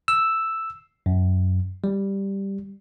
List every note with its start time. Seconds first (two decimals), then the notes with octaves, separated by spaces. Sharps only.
0.08 E6
1.06 F#2
1.84 G3